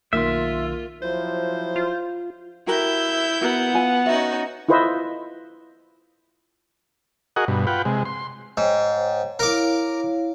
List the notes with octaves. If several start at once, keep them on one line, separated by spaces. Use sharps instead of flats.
B1 D#3 A#3 F4 E5 C6
F3 F#3 E4 C5
F4
E4 F#4 G4 A#4 E5 G6
B3 F#4 A#4 F#5
F4 G#5
C#4 D#4 F#4 E5
E4 F4 B4 C5 D#5 E5
F#4 G#4 A#4 D#5 F#5
G2 B2
F4 B4 F#5 G5
C3 G#3
C6
G#2 C5 C#5 G5
E4 A#4 C#5 F5 D6